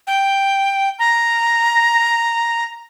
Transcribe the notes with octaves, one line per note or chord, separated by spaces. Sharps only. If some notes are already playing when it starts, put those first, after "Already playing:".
G5
A#5